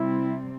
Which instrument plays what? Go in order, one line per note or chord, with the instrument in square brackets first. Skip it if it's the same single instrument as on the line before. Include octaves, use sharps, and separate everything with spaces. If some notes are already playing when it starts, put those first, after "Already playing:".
Already playing: [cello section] C3 G3 C4 [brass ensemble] E4